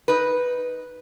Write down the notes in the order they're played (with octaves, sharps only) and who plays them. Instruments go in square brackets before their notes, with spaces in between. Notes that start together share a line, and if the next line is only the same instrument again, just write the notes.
[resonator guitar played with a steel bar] D#4 B4